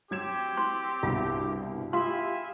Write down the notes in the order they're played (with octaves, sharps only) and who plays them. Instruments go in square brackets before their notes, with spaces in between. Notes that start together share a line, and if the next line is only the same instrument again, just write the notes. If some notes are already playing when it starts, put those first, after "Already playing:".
[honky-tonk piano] F#3 G#6 E7 [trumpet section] C4 G4
[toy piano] C6
[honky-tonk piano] C2 G2 B2 [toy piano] F4
[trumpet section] E4 G#4 E5 [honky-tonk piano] F4 G4 [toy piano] C6